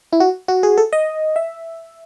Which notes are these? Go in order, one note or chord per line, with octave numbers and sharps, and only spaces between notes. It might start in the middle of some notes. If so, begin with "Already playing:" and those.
E4
F#4
F#4
G#4
A4
D#5
E5